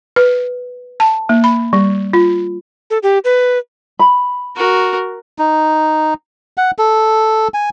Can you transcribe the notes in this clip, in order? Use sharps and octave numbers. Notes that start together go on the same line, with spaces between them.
B4
A5
A#3
B5
G3
F4
A4
G4
B4
B5
F#4 A#4
D#4
F#5
A4
G#5